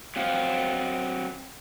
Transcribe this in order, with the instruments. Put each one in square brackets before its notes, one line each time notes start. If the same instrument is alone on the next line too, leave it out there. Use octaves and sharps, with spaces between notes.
[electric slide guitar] F#3 C4 F5